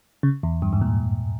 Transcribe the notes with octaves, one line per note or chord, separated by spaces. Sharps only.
C#3
E2
G2
G#2
A#2